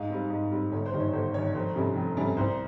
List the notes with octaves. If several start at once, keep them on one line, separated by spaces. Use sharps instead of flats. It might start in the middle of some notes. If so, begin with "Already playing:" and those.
Already playing: G#2 F5
G3 C4
G#2
G3 C4
G1 C#5
C5
G2 D#3
C#5
G1 C5
G2 D#3 C#5
F1 C5
F2 C3 G3 C#4
F1
F2 C3 G3 C#4
C2 C5